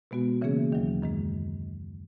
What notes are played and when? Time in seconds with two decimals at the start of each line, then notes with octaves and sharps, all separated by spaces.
0.11 B2 G#3 B3 F#4
0.42 C#3 E3 A#3 C#4 G#4
0.72 D#2 D#3 F#3
1.02 F#2 D#3 G#3